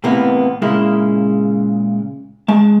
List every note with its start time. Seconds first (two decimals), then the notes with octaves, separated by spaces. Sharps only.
0.04 A2 C3 E3 A#3 B3
0.62 A#2 C#3 G#3 A#3 E4
2.48 G#3 A5